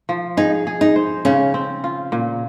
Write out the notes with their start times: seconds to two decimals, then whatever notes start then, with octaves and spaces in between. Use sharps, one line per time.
0.09 F3
0.37 D#4 G#4
0.67 G#4
0.81 D#4
0.96 C5
1.25 C#3 C#4
1.54 C4
1.84 F4
2.12 A#2